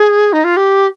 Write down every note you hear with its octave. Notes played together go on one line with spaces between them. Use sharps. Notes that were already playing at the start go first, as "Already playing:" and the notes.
Already playing: G#4
D#4
F4
G4